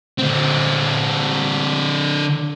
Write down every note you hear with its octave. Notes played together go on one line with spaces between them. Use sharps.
D3 C4